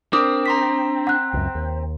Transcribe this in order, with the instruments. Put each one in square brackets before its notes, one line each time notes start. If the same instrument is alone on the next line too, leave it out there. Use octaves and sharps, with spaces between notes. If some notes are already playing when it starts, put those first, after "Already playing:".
[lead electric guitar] C4 [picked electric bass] D4 [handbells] A#4 [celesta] D6 D#6
[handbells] A#5 C6 B6
[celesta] F#5 F#6
[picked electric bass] C#2 F#2
D#2